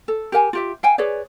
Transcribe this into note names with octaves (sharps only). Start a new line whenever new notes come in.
A4
G4 A#4 F#5 G#5
F4 G4 E5
F5 G5 G#5
G#4 B4 C#5 D5